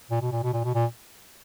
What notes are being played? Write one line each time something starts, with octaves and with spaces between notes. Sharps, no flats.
A#2
B2
A#2
B2
A#2
B2
A#2